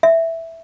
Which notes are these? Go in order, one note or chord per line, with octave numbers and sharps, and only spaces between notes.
E5